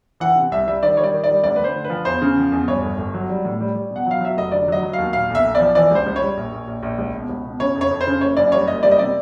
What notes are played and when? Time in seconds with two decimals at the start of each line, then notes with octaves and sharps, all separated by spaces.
0.20 E3 F#5
0.36 C3
0.52 C2 E5
0.67 G3 E5
0.83 D#3 D5
0.97 G3 C#5
1.04 D5
1.14 D#3
1.24 D5
1.29 G3
1.44 D2 D5
1.56 B4
1.59 D2 C5
1.76 D3
1.85 B4
1.90 F3
2.05 E2 C5
2.22 C#3
2.37 F3
2.52 E2
2.68 G2 C#5
2.82 G1
2.98 G1
3.14 F#3
3.29 G3
3.45 A2
3.60 G3
3.75 G3
3.91 B2
3.96 F#5
4.07 F#3 F5
4.21 F#3 E5
4.37 F1 D#5
4.52 D3 D5
4.68 F#3 D#5
4.83 F#3
4.93 F5
4.98 D#2
5.13 A#2 F5
5.30 B1
5.35 E5
5.44 B1
5.55 D5
5.60 F3
5.75 E3 D5
5.91 C#2 C5
6.07 C#2
6.16 C#5
6.22 G3
6.37 A#1
6.52 A#1
6.67 A#1
6.83 A#1
6.99 C#2
7.15 B2
7.29 C#2
7.44 B2
7.60 C#3 C#5
7.75 F2
7.81 C#5
7.91 F2
8.01 C5
8.07 C#3
8.21 F#1 C#5
8.37 F#2 D5
8.52 G3 C#5
8.67 F#1 D#5
8.83 G3 D5
8.91 D#5
8.99 C3 D5